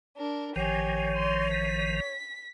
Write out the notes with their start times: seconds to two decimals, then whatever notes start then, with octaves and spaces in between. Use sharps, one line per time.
0.17 D4 A#4
0.56 A1 D#3 F3 G4 C#5 G#5
1.16 C6
1.50 B6